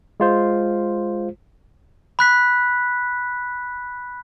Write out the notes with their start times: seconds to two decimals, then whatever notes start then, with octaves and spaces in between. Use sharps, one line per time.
0.20 G#3 F4 C5
2.19 B5 F#6 B6